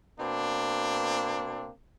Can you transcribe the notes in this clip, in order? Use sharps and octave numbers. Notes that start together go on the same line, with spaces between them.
B2 A#3 C4 D4